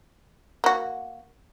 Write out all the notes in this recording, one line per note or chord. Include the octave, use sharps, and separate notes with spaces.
A#3 F#4